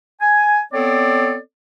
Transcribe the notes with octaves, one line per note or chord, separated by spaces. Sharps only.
G#5
B3 C4 A4 C#5 D5